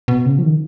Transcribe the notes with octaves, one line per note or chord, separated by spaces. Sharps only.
B2
C#3
F3
D#3